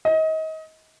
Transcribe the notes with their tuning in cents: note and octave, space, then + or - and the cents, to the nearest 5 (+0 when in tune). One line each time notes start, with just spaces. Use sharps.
D#5 +30